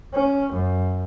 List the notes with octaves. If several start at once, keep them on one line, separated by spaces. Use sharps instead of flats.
C#4
F#2